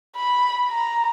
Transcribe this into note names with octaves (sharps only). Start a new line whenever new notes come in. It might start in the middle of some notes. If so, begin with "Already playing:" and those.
B5
A#5